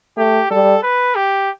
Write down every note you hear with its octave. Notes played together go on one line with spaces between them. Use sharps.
A3 G4
G3 A4
B4
G4